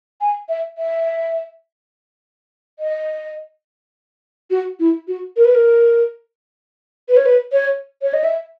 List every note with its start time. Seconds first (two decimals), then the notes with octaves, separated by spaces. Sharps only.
0.21 G#5
0.49 E5
0.78 E5
2.79 D#5
4.51 F#4
4.80 E4
5.08 F#4
5.36 A#4
5.45 B4
5.55 A#4
7.09 B4
7.17 C#5
7.26 B4
7.52 C#5
8.02 C#5
8.14 D#5
8.24 E5